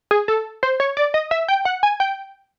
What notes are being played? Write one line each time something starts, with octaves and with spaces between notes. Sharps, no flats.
G#4
A4
C5
C#5
D5
D#5
E5
G5
F#5
G#5
G5